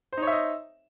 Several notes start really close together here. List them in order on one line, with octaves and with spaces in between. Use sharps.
C5 D#4 C#5 E5 D#5